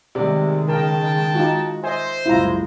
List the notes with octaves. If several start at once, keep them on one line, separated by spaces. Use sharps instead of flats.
C3 D#3 G#3 A3 D5
C#3 A#4 G5 A5
D#4 F4 F#4
C5 D#5 E5 G#5
F#1 C2 G#3 E4 F4 A#5